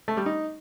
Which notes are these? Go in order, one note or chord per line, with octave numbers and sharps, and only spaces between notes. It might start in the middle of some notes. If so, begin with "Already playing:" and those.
A3
G3
D#4